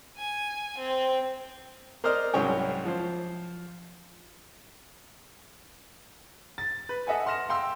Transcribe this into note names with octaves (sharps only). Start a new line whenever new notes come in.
G#5
C4
A#4 C5 D5 D#5 F6
C2 G#2 F#3 C#4 C#5 G5
F3 C5
A6
B4
A4 D#5 E5 F#5 G#5
F#5 C6 F6 A#6 E7
F5 G5 C6 E6